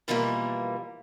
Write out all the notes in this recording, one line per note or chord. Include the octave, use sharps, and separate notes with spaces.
B2 D3 E3 F3 G3 A#3